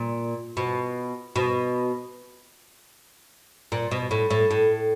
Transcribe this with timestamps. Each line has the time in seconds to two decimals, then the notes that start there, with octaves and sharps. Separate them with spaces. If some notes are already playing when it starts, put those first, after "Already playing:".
Already playing: A#2
0.57 B2
1.36 B2
3.72 A#2
3.91 B2
4.11 A2
4.30 A2
4.51 A2